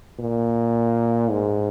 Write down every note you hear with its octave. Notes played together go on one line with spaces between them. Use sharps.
A#2
G#2